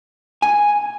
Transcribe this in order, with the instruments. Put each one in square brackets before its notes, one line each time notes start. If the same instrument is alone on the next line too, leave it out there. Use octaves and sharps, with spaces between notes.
[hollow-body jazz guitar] G#5